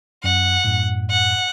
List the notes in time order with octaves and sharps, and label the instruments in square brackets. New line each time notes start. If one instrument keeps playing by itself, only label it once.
[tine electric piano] F#2 [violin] F#5
[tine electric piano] F#2 A2
[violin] F#5